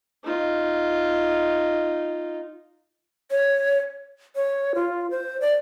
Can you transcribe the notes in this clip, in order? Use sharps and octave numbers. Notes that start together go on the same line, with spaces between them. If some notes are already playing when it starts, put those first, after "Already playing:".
D#4 F4
C#5
C#5
F4
C5
D5